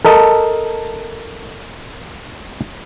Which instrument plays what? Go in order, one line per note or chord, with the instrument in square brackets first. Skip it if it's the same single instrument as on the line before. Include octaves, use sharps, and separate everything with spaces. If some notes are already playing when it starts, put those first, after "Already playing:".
[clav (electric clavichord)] A4 A#4 D#5 A5